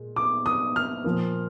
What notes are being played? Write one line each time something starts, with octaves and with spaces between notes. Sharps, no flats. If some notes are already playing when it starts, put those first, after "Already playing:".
Already playing: A#2 G#3
D6
D#6
F6
A#2 F3 A#3